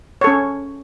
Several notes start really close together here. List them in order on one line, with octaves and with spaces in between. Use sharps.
C#5 A4 C#4